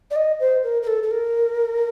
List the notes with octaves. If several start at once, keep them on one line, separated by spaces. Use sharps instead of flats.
D5
D#5
C5
A#4
A#4
A4
A4
A#4